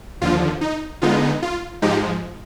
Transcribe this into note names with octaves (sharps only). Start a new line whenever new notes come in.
D#2 D3 F3 F4
D#4
D3 G#3 B3 D#4 F4
F4
G#2 F3 G#3 D#4 G4